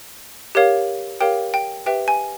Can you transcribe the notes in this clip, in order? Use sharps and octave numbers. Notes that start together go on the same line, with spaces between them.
G4 A#4 C#5 F5
G4 A#4 C#5 F5 G5
G5
G4 B4 E5 G5
G#5